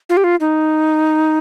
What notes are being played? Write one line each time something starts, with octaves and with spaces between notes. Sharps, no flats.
F4
G4
F4
D#4